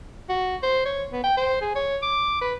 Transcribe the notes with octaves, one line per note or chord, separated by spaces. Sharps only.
F#4
C5
C#5
B3
G5
C5
G#4
C#5
D6
B4